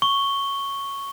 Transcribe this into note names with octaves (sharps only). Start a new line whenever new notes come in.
C#6 G7